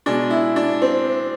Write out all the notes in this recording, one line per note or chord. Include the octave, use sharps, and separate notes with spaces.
B2 G#3 D4
E4
D4
C4